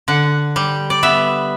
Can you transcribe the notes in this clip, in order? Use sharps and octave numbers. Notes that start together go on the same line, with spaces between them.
D3 F#5
G3
D5
B3 E5